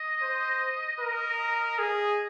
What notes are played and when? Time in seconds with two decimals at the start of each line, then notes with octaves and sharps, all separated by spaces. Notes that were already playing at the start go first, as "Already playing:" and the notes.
Already playing: D#5
0.22 C5
1.01 A#4
1.78 G#4 D#5